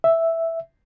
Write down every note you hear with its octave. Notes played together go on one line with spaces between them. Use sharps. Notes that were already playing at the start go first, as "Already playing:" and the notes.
E5